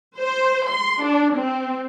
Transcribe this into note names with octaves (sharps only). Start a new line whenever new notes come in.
C5
C6
D4
C4